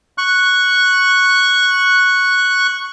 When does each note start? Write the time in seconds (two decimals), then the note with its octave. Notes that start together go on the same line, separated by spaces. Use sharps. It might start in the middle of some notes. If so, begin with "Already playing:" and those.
0.18 C#6 F#6